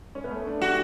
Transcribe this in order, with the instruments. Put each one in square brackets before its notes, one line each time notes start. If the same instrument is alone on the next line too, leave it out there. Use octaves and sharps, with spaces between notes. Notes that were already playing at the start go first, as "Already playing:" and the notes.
[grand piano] C#4
B3
A3
D4
[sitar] F#4 [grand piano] G4